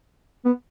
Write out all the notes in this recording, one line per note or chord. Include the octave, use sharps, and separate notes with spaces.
B3